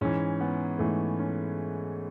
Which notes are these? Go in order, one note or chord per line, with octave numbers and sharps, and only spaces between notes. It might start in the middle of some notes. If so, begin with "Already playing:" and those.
G#2 E3 C#4
B3
G#2 E3 A3
C#4